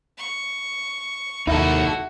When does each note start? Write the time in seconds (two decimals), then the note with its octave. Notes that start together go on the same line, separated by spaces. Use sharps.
0.18 C#6
1.47 D#2 D#4 E4 F#4 A4